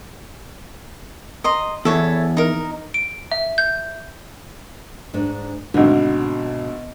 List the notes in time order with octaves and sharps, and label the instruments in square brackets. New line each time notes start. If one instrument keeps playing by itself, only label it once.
[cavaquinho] D#5 A#5 C6
[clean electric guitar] E2 [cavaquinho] A4 C#5 E5
[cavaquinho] D#4 A#4
[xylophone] D7
E5
G6
[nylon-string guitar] G#2 D4
[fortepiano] G#1 D3 [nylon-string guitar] B2